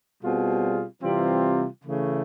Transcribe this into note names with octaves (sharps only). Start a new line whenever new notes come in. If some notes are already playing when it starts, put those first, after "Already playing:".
B2 G3 C4 F4 G#4
C3 E3 G3 C4 F4
C#3 E3 A3